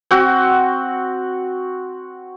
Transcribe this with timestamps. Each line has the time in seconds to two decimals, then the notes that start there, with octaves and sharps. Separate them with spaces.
0.11 C4 F#4